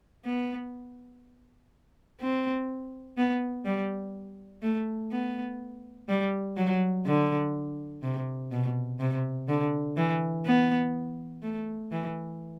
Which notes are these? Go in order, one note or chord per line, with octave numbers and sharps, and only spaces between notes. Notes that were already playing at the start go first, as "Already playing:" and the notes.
B3
C4
B3
G3
A3
B3
G3
F#3
D3
C3
B2
C3
D3
E3
B3
A3
E3